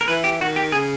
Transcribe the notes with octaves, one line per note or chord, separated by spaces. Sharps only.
A#4
E3 B4
G4
D#3 F#4
G4
C#3 G#4